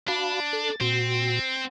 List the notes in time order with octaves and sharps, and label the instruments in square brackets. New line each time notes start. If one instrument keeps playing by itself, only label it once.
[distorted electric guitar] D4 [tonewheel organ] F#4 F5 B5
[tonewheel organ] A4
[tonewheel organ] A#2 F#4 [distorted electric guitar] C4